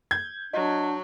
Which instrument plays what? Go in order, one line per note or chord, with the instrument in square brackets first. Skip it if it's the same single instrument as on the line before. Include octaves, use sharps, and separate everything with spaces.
[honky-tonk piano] G6 G#6
[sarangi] F#3 [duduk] D4 [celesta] D#5